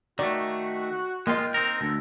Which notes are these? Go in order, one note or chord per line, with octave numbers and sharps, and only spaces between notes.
D#3 A3 F#4 D5
G#3 A#3 F4 D#5 G5
C4 D#4 A#4
D2 G#3 D4 A4